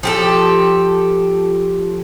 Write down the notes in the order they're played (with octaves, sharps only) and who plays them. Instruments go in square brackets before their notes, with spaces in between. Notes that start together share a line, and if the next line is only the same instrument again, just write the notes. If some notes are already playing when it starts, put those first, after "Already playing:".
[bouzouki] F3 G4 A4